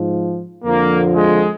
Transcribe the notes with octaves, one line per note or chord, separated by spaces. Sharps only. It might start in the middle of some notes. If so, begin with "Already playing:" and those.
Already playing: G#2 F3
F2 D3 F3 A#3
G#3